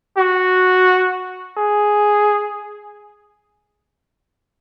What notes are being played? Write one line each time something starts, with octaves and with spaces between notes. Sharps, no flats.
F#4
G#4